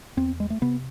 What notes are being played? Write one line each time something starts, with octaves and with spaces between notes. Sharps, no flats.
E2 C4
G#3
A3
C3 B3